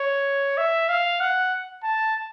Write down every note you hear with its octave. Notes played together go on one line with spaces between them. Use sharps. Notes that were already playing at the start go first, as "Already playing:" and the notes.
Already playing: C#5
E5
F5
F#5
A5